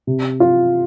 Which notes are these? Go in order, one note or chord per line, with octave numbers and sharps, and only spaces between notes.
C3
F4